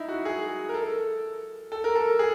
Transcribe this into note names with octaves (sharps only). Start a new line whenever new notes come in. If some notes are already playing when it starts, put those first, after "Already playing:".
Already playing: D#4 E4
F#4
G#4
A#4
A4
A4
A#4
A4
G#4